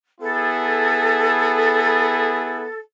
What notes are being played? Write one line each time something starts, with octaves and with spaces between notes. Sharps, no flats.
B3 E4 G#4 A4